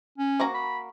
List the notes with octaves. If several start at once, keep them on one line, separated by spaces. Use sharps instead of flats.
C#4
A#3 F#4 A#5
B5